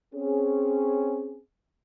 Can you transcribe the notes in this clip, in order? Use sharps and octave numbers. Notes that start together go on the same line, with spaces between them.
C4 C#4 G#4